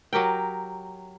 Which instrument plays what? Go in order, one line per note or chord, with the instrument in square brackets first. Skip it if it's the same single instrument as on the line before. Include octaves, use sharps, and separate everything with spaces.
[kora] F#3 G4 A#4 G5